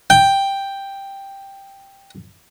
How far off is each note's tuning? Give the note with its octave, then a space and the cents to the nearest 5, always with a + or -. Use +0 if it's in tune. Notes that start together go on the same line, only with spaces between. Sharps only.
G5 +5